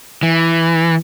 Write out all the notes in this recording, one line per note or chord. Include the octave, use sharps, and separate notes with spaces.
E3